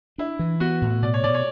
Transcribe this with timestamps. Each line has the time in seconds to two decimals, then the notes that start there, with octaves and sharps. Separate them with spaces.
0.18 D4 E4
0.39 E3
0.60 B3 F#4
0.82 A2
1.02 B2 D5
1.14 C#5
1.24 B2 D5
1.34 C#5